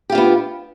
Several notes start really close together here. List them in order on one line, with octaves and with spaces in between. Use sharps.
G4 F4 D4 B3